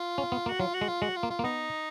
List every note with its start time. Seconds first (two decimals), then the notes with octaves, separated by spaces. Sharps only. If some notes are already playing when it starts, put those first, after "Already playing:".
Already playing: F4
0.18 C#4
0.32 B3
0.46 A#3 F#4
0.60 F#3 F4
0.74 F#4
0.81 G#3
0.88 F4
1.02 G#3 F#4
1.16 F4
1.23 A#3
1.30 F4
1.39 A#3
1.44 B3 D#4